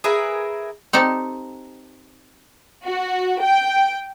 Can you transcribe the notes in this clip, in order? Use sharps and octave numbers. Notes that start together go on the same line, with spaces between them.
G#4 A#4 B4 E5
C4 D#4 G4 A4
F#4
G5